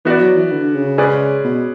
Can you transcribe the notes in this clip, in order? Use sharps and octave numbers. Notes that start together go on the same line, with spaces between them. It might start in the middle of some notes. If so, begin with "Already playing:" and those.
E3 B3 F#4 B4 D5
F#3
E3
D3
C#3
G#3 C#4 G#4 B4 D5
B2